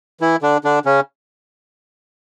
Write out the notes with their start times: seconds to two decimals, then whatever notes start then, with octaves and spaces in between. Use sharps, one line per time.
0.21 E3 E4
0.42 D3 D4
0.64 D3 D4
0.85 C#3 C#4